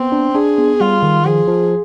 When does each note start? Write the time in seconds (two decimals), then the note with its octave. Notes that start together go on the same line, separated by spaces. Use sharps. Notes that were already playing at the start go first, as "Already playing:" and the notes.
Already playing: B3 C4
0.12 D4
0.35 D4 G#4
0.58 B3
0.81 G3 F4
1.03 D#3
1.26 F3 G#4
1.48 F3